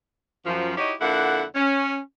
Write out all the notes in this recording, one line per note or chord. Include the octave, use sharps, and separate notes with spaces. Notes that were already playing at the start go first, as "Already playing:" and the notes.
F#2 F3
D#4 E4 F#4 G4 C#5 D#5
F2 D3 A#3 E4 F#5
C#4